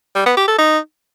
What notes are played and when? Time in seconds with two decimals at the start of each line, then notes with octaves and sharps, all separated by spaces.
0.15 G3
0.26 B3
0.37 G4
0.48 A4
0.58 D#4